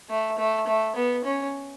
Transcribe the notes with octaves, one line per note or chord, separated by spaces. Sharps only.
A3
A3
A3
B3
C#4